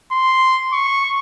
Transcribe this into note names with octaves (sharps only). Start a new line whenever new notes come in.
C6
C#6